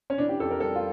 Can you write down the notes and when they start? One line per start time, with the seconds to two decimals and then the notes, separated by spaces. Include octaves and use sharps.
0.10 C#4
0.18 E3 D4
0.29 G4
0.39 F2 A4
0.50 A#4
0.60 G3 A4
0.75 F4